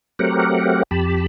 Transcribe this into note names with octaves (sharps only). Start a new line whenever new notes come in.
F#3 A3 C4 G4 A#4 F#5
F2 G4 A5 B5